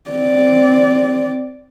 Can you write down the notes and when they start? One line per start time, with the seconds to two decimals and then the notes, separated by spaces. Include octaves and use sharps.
0.10 C4 D5